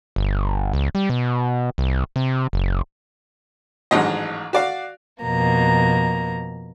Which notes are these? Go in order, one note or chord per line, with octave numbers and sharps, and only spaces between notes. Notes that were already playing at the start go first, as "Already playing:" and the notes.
G1
C#2
G3
B2
C2
C3
F#1
A1 G#2 D#3 F#3 D4 D#5
F#4 D5 F5
F2 B2 A#3 A#5